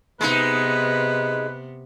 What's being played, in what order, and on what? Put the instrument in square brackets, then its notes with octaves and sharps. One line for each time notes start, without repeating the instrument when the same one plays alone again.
[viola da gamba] C3 B3 [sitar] G#3 D#4 [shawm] B4